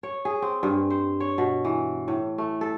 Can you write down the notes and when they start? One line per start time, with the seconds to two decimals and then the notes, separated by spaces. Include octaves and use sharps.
0.03 C#5
0.25 G#4
0.42 C4
0.63 G2
0.90 C5
1.20 C#5
1.38 B2
1.64 E3
2.08 A2
2.38 A3
2.61 A4